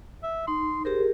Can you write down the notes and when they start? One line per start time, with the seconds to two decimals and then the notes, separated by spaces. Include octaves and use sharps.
0.23 E5
0.48 D#4 C6
0.85 G4 G#4 A#4 C5